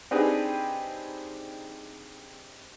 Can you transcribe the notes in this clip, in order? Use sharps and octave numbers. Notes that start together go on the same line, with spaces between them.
C4 D4 D#4 G4 G#4 B4